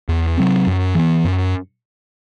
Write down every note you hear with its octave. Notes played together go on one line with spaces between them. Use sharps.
E2
C3 F#3 C4
F#2
E3 B3
F#2